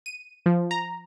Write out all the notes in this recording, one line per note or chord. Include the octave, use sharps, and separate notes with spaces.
D#7
F3
A#5